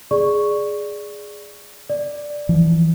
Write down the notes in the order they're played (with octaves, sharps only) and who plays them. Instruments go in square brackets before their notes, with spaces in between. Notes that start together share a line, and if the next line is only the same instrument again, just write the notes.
[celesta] G#4 D5 C#6
D5
[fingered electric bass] E3 F3